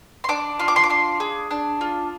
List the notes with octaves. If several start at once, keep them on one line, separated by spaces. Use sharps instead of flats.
C6
D4 D6
F4 C6
D6
C6
D6
D4 C6
G#4
D4
F4